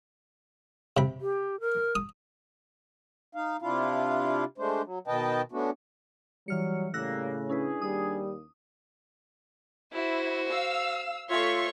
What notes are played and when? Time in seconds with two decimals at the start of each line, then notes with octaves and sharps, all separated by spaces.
0.97 C3 B5
1.21 G4
1.60 A#4
1.95 D#6
3.35 D#4 F5
3.62 C3 D4 E4 F4 F5
4.58 G#3 A3 D4 C5
4.85 F#3
5.07 B2 D#3 B4 D#5 G5 A5
5.52 A3 B3 C#4 D4 F#4
6.48 E3 F#3 G3 F6 C#7
6.94 A2 C#3 G3 A#3 E6 F#6 A#6
7.49 C#4 D4 E4 G#4 B4
7.82 D#2 G3 D#6
9.93 E4 F#4 C5
10.51 F5 E6
11.30 A3 F4 C#5 E5 C6 C#6